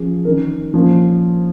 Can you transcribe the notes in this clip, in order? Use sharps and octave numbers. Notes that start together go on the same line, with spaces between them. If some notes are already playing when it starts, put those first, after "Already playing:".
Already playing: F3 C#4 G#4
D#3 C#4 A#4
A#2 F3 C#4